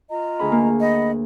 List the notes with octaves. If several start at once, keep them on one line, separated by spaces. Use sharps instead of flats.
F4 D#5 A#5
D2 G#4 B5
A#3
D#5 F#5 B5